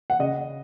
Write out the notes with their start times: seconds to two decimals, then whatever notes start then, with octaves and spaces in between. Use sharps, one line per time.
0.10 F#5
0.19 C#3 D#5